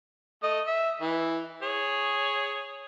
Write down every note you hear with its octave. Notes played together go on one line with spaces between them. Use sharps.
A3 D#5
E5
E3
G#4 C#5